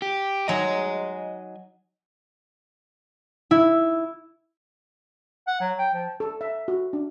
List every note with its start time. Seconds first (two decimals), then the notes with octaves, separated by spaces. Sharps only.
0.02 G4
0.48 F#3 D#4 D#5 G#5 A#5
3.51 E4
5.47 F#5
5.61 F#3
5.79 G5
5.94 F3
6.20 A4
6.41 E5
6.68 F#4
6.93 D4